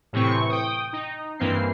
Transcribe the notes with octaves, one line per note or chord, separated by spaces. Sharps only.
A2 C3 E3 C4 C#6
G5 D#6
D#4
G2 E3 A#3 C4 C7